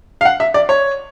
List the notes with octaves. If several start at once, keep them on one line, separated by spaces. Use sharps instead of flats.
F5
F#5
E5
D5
C#5